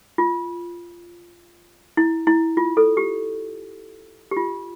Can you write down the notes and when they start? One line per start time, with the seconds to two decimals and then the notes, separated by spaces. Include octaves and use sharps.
0.18 F4
1.97 E4
2.27 E4
2.57 F4
2.77 A4
2.97 G4
4.31 G4
4.37 F4